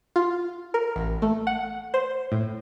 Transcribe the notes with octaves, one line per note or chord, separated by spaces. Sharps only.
F4
A#4
A1
A3
F#5
C5
A2